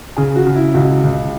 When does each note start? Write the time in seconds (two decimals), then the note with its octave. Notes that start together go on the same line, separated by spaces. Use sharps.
0.17 C#3 G#4
0.36 F#4
0.46 C#3
0.56 E4
0.74 C#2 F#4
1.04 C#2